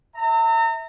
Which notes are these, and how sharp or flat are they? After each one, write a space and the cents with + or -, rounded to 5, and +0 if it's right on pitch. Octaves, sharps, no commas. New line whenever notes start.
E5 -20 A#5 -40